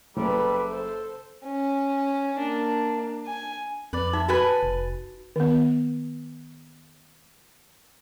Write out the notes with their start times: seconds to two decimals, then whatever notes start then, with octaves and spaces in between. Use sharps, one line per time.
0.17 F#1 G3 A4 B4
0.71 A4 C5
1.44 C#4
2.39 A#3 D4
3.26 G#5
3.93 F2 B4 D5
4.13 D#4 E5
4.28 F#4 B4 G#5 A5
4.63 F1
5.36 D#3 B3